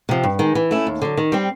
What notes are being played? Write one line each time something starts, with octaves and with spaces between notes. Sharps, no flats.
C3 F3
G2
D#3 G#3
E3
A3 C#4 E4
D#2
D3 F#3
D#3
G3 C4